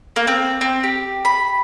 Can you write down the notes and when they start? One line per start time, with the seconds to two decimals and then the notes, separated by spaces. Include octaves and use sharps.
0.16 A#3
0.27 C4
0.61 C4
0.83 G4
1.25 B5